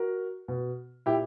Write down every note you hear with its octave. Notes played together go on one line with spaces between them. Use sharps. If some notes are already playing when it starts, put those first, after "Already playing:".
Already playing: F#4 A#4
B2
A#2 E4 G4